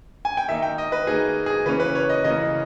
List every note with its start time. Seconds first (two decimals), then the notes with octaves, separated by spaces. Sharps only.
0.25 G#5
0.37 G5
0.48 D#3 A#3 D#4 E5
0.62 G5
0.78 D#5
0.92 B4
1.07 D#3 A#3 D#4 G#4
1.46 G#4
1.66 C#3 E3 A#3 C#4 B4
1.80 B4
1.95 C#5
2.09 D#5
2.24 C#3 E3 A#3 C#4 D#5